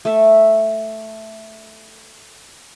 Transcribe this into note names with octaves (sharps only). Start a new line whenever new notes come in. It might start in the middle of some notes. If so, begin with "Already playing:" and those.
A3 E5